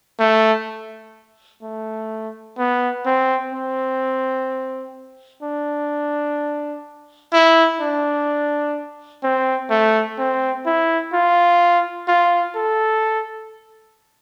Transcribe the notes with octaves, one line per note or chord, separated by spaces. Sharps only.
A3
A3
B3
C4
C4
D4
E4
D4
C4
A3
C4
E4
F4
F4
A4